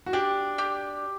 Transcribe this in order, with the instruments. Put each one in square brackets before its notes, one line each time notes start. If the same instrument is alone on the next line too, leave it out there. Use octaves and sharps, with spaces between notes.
[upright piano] F#4
[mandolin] D4 [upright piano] G4
[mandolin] G4